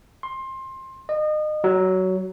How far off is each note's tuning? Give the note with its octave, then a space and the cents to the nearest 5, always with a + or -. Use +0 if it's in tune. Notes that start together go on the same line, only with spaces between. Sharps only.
C6 +20
D#5 -30
F#3 +15